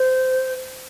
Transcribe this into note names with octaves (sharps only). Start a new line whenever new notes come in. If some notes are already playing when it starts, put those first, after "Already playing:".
Already playing: C5